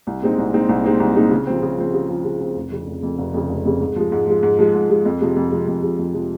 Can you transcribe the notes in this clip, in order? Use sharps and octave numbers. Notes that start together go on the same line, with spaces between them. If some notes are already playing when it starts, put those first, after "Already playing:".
C2
A#2 G#3 C4 D#4
C2
A#2 G#3 C4 D#4
C2
A#2 G#3 C4 D#4
C2
A#2 G#3 C4 D#4
C#3
F3 C4
C#3
F3 C4
C#3
F3 C4
C#3
F3 C4
F1
F2 C#3
F1
F2 C#3
F1
F2 C#3
F1
F2 C#3
G#2
F3 G#3
G#2
F3 G#3
G#2
F3 G#3
G#2
F3 G#3
F2
C3 F3 G#3
F2
C3 F3 G#3
F2
C3 F3 G#3
F2
C3 F3 G#3